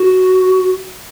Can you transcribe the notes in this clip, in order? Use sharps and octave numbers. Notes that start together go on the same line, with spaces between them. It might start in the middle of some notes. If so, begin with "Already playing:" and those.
Already playing: F#4